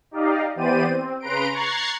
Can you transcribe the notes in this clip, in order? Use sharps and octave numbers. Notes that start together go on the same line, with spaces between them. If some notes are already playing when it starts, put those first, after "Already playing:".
D#4 G4 D5 D#5 F5
E3 B3 G4 C5 D5 D#7
C4
C#3 B4 A#5 C6 D7
A#5 C#6 F#6 G#6 A6 C7